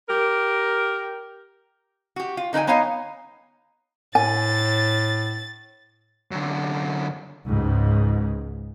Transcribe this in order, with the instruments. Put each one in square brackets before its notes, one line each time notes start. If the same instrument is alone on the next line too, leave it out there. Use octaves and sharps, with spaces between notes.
[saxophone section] G4 A#4
[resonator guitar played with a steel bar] F#4 G4
F4
D3 D#4 B4 G5 G#5
B3 D#4 C#5 F5 G#5
[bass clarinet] A2 [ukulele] G#5 [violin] A6
[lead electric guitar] F#2 D3
[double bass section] C#2 G#2